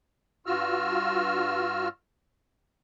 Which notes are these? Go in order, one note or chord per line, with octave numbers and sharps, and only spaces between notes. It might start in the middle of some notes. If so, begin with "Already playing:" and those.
G2 F4 F#4 E6 F6